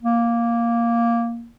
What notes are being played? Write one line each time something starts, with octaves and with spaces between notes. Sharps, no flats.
A#3